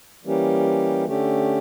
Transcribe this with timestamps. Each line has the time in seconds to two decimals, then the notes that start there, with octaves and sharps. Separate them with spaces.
0.25 E3 G3 A#3 C#4 G4
1.07 D3 A3 C#4 G4